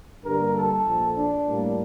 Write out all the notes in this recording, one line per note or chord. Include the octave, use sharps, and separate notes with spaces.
G2 D3 G3 A#3 A#4
A4
A#1 A#2 F3
D4
A2 G3 A#3